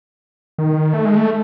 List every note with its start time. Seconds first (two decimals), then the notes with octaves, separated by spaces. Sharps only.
0.58 D#3
0.94 A3
1.05 G#3
1.17 A3